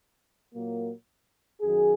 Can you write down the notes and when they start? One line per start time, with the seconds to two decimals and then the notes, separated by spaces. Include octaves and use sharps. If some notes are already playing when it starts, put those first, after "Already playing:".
0.54 A#2 F#3 A#3
1.61 F#2 D#3 F#3 G#4